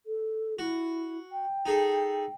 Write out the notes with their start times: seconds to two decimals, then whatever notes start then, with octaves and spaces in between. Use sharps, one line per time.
0.06 A4
0.59 E4 F#4
1.32 G5
1.66 D#4 G#4 A4